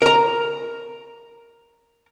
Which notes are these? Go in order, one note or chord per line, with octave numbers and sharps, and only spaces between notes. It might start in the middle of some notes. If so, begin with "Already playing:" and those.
A#4 A#5